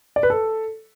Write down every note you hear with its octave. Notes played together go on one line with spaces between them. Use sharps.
D5
B4
A4